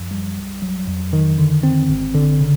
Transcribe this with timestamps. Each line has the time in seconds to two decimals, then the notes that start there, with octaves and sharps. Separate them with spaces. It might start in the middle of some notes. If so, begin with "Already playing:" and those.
Already playing: F#2 F3
0.11 G3
0.36 B1
0.62 F#3
0.87 F2
1.13 D#3
1.38 D3
1.63 C4
1.89 G#1
2.15 D3
2.40 C#3